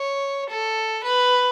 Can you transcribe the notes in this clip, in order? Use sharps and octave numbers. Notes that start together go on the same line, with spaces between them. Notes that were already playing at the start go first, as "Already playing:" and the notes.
Already playing: C#5
A4
B4